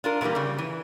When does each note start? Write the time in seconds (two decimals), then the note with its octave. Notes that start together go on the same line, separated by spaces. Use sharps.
0.04 D4 F4 A#4
0.21 A#2 D3 E3 G3 A#3
0.35 C#3 G3
0.58 E3